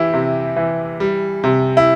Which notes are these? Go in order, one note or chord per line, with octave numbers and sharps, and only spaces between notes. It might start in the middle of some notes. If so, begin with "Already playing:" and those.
Already playing: E3 E4 G4
C3
E3
G3
C3
E4